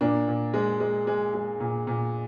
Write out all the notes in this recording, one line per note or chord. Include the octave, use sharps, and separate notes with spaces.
A#2 A#3 D4
A#2
G#3
G#3
G#3
G#3
A#2
A#2